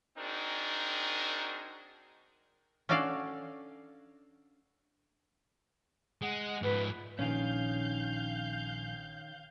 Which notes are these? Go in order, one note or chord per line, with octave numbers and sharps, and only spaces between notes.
C4 D4 D#4 F#4 G#4 A#4
C#4 D4 F#4 A4 D5 F5
G#3 F#5
G#2 F3 B4
A#1 D#3 C#4 F5 G#5 G6